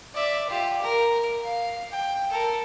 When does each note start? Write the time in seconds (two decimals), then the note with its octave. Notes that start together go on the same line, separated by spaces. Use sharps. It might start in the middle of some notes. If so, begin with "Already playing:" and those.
0.14 D5 E5
0.50 F4 G4
0.82 A#4
1.44 F5
1.91 G5
2.30 A4 A#4